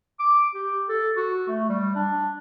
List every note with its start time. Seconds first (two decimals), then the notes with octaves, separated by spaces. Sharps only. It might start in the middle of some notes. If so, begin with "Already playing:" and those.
0.19 D6
0.54 G4
0.88 A4
1.16 F#4
1.48 A3
1.69 G3
1.96 D4